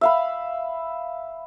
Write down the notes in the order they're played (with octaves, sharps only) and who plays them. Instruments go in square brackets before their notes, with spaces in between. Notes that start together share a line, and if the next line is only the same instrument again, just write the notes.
[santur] E5 F5 B5